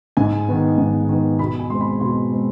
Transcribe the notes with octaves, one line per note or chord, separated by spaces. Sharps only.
G#2 G#5
D#3 B3
G#2
D#3 B3
B2 B5
G#5
G#3 C4 C6
B5
B2 C6
G#3 C4